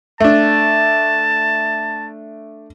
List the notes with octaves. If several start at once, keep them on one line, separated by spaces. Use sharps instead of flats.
A3 D4 A5